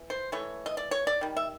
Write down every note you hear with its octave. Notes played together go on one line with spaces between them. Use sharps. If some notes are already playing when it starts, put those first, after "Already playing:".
Already playing: E3
C5
E3 A3 C#5
D#5
D5
C#5
D5
D#3 G3
E5